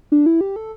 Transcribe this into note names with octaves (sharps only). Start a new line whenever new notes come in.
D4
E4
G4
A4